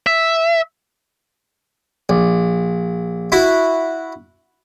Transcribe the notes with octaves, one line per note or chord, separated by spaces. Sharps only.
E5
A#1
E4 F#4